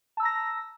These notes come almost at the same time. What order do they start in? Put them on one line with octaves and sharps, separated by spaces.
A5 E6 A#5 A#6